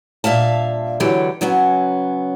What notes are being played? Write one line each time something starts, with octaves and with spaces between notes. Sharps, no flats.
G2 A#2 E5 F5 A5
D3 E3 F#3 G4 C#5
C#3 F#3 B3 C#4